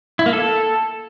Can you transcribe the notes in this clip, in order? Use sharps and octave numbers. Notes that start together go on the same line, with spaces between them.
E4
A#3
A4